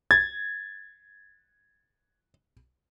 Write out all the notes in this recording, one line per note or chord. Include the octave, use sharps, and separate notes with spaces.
G#6 A6